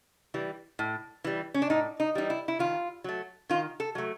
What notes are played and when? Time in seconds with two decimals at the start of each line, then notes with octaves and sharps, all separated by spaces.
0.34 E3 G3
0.79 A2
1.24 E3 G3
1.54 C#4
1.62 D4
1.70 A2 D#4
2.00 D#4
2.15 E3 G3 D#4
2.30 E4
2.48 E4
2.59 D#3 F4
3.04 F#3 A3
3.50 D#3 F4
3.80 A4
3.95 F#3 A3